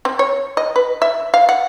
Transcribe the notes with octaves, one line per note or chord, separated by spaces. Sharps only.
C4
C#5
D#5
B4
E5
F5
F#5